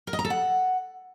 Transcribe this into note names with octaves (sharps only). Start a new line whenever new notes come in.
A#4
D#5
A#5
A4
F#5